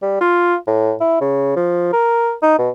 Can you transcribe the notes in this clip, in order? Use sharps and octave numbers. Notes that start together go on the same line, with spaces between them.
G3
F4
A2
E4
C#3
F3
A#4
D#4
B2